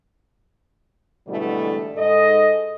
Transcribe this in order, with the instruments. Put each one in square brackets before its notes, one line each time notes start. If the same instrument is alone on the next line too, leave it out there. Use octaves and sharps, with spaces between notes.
[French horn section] G#2 B2 D3 E3 G3 A3
G#2 A4 D#5